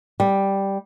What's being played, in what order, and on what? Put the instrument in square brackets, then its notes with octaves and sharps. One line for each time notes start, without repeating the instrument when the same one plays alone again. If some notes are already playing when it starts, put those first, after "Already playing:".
[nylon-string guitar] G3